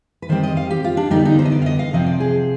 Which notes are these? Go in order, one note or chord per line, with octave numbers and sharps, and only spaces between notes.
B4
D#3 G3 C4 C5
D#5
F5
G4
F4
D4
D3 G3 B3 D#4
D#4
C5
D#5
D5
F5
D#5
F5
C3 F3 C4 D#5
D5
G#4